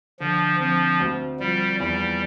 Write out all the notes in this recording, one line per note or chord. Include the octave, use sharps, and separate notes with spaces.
D3 F3
F3 C4
D2
F3 G3
E2 G3